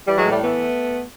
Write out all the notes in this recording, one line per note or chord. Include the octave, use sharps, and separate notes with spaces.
E3 G3
F#3 G#3
A2
G3 A3
E3 A3 B3